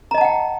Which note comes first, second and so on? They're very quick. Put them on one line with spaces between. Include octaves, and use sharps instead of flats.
A#5 D#5 A5 F#5 G5